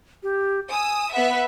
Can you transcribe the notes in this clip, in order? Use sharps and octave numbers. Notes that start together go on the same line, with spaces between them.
G4
G#5 D#6 E6
B3 B4 E5 F#5